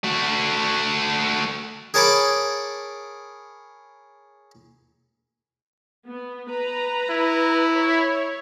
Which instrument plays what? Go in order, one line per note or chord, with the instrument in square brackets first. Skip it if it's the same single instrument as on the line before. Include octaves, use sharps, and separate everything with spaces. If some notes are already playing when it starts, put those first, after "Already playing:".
[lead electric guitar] A3 F#4
[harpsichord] G#4 A#4 C#5 A5 B5 D6
[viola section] B3
B4 A#5
[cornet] E4
[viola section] C#5